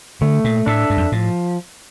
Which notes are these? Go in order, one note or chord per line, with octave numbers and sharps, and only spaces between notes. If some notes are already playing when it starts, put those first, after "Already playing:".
D3 A3
A#2
A2 D4 A4 E5
G2
F2
A2 F3